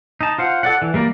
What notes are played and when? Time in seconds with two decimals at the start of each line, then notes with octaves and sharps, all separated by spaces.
0.21 D#4 A5
0.38 F4 C5 F#5
0.63 A4 D5 F#5
0.82 E3
0.94 G3 A#3 A#4 D5